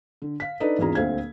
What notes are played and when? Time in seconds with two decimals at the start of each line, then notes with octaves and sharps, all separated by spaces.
0.22 D3
0.40 F5 B6
0.60 D4 D#4 A4 B4 D5 D#5
0.78 G#1 E2 D4 F4 G#4 A#5
0.95 D#1 D2 C4 F5 G#6